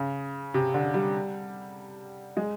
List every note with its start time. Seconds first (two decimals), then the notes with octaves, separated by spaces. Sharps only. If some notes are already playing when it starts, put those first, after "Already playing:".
Already playing: C#3
0.54 C3
0.74 D3
0.94 G3
2.37 G#3